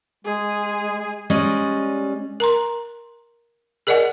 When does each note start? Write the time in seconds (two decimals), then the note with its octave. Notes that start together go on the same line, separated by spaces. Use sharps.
0.25 G#3 G#4
1.30 G3 G#3 C#4 D5 D#5
2.40 A#4 A#5 C6
3.87 G#4 A#4 D5 D#5 F#5 G#5